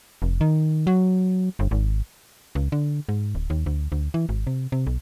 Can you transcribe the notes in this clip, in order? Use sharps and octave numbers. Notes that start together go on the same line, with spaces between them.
F1
D#3
F#3
G1
G#1
C#2
D3
G#2
D1
D#2
D2
D2
E3
G#1
C3
C3
B1